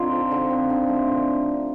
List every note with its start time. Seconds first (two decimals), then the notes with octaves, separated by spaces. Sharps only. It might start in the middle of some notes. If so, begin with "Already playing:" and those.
Already playing: D3 C4 D#4 F4
0.11 F3
0.31 D3
0.50 C4
0.70 D3
0.89 A3
1.08 D3